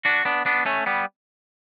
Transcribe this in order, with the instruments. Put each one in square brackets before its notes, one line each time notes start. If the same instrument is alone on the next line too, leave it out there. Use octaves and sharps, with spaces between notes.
[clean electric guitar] D4 F#4
B3 D4
B3 D4
A3 C#4
G3 B3